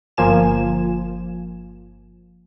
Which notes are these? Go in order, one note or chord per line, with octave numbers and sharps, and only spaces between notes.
G1 F3 A#3 G#5 E7